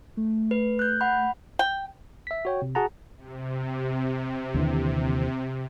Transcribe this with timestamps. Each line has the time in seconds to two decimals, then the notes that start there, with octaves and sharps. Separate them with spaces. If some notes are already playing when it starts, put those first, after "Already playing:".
0.17 A3
0.51 B4
0.79 F#6 G6
1.01 F#5 B5
1.59 G5
2.27 E5 B6
2.45 F#4 C#5 G5
2.62 C3
2.75 F#4 G#4 F#5 A5 A#5
3.17 C3
4.54 D#2 D3 E3